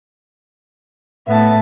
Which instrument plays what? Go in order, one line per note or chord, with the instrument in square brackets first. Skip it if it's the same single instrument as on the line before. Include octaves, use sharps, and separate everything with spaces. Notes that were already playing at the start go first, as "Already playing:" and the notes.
[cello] A2 [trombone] B3 [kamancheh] E5 A5